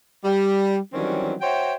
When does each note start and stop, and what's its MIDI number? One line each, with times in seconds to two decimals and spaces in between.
0.25 0.76 55
0.93 1.33 51
0.93 1.33 52
0.93 1.33 54
0.93 1.33 55
0.93 1.33 60
0.93 1.33 61
1.41 1.74 66
1.41 1.74 72
1.41 1.74 73
1.41 1.74 76
1.41 1.74 79